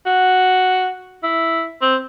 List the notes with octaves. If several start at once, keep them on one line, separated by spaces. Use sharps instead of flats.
F#4
E4
C4